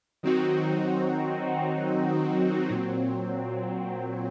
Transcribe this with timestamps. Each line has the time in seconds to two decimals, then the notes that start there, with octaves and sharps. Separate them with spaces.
0.23 D#3 F#3 C4 D#4 F#4
2.69 A#2 F#3 C4